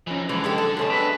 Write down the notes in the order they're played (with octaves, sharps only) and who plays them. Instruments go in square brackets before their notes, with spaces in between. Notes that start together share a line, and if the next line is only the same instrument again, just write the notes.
[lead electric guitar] E3 D#4 [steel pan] F3 C#4
[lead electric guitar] D3 [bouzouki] E3 [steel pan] F#3 G#3
[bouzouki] G#3 G4 A4 [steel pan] D#4
[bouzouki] A4
[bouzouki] B2 C#4 A5 [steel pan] F#4 G#4 A4
[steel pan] D4 [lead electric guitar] G4 E5 [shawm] B4